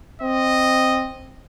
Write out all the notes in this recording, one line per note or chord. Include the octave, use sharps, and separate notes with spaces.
C4 D#5